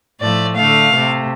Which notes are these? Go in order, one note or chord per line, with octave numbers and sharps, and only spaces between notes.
A2 F3 A3 D5
D3 A3 F5
C3 A3